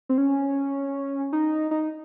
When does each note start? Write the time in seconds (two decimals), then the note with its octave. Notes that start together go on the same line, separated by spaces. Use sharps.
0.09 C4
0.18 C#4
1.33 D#4
1.71 D#4